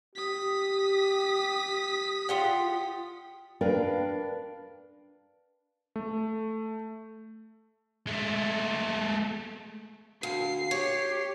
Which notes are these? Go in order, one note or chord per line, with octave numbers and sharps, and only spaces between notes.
G4 D#6 B6
F4 G4 F#5
D4 A#4 B4 D5 F5 G5
A3
G#3 A3
D2 F5 C7
G4 C#5